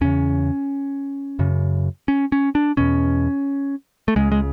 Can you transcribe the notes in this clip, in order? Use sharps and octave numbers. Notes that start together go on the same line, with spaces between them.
E2 C#3 C#4
F#2 C#3
C#4
C#4
D4
E2 B2 C#4
A3
C#2 C#3 G#3
G#3